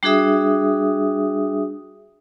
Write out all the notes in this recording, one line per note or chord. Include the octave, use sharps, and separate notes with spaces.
G3 D4 F#4 G#4 E5 D#6